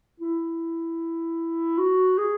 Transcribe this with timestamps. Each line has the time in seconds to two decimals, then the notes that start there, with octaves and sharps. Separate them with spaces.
0.20 E4
1.78 F#4
2.18 G#4